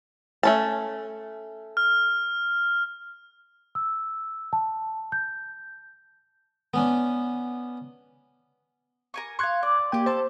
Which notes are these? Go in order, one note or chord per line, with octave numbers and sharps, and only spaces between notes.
A3 C#4 A5
F6
E6
A5
G6
B3 C#4 D4
A#4 G#5 C#6
F5 C6 C#6 F#6 G#6
D5
A#3 G4 D5 G5 G#5
A4 C5 A5 C6